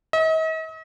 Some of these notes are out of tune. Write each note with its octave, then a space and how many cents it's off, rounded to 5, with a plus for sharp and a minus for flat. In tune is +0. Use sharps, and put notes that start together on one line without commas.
D#5 +45